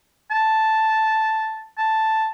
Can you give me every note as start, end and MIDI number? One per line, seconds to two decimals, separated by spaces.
0.31 1.65 81
1.78 2.28 81